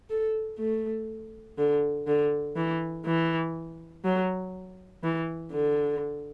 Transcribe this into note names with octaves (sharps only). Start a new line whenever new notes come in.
A4
A3
D3
D3
E3
E3
F#3
E3
D3